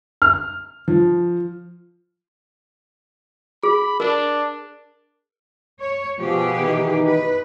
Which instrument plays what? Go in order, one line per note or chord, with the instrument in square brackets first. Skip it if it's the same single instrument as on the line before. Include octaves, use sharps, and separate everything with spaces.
[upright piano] F6
F3
[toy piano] G#4 [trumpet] B5
[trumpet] D4 [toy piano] A#4
[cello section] C#5
[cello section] B2 G4 G#4 [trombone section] F3
[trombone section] D#3 E3 D#4
[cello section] B4